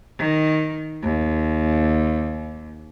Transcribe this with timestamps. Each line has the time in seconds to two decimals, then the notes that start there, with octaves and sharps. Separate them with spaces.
0.18 D#3
1.03 D#2